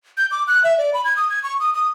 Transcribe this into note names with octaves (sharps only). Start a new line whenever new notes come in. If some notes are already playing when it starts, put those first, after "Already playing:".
G6
D6
F#6
E5
D5
B5
G#6
D#6
G#6
C#6
D#6
D#6